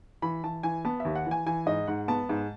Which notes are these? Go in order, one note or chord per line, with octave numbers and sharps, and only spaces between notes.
E3 B5
E3 A5
E3 G#5
B3 A5
D#2 E5
F#5
E3
G#5
E3 G#5
G#2 D#5
G#2 F#5
B3 A5
G#2